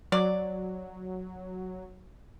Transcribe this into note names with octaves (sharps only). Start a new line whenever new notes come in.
F#3 D5